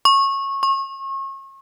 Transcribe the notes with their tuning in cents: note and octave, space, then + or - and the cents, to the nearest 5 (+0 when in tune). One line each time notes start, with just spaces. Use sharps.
C#6 -20
C#6 -35